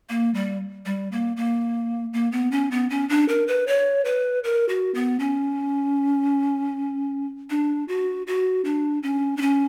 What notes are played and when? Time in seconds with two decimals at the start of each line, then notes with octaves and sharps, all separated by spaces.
0.09 A#3
0.34 G3
0.86 G3
1.12 A#3
1.37 A#3
2.14 A#3
2.32 B3
2.51 C#4
2.71 B3
2.90 C#4
3.09 D4
3.29 A#4
3.48 B4
3.67 C#5
4.05 B4
4.44 A#4
4.69 F#4
4.95 B3
5.20 C#4
7.50 D4
7.88 F#4
8.27 F#4
8.65 D4
9.03 C#4
9.37 D4
9.41 C#4